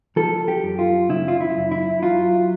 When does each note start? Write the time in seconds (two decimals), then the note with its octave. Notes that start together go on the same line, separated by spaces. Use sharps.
0.16 F3 A4
0.48 G4
0.63 F#2
0.79 F4
1.09 C#3 E4
1.28 F4
1.41 E4
1.56 F#2
1.72 E4
2.02 F#3 F4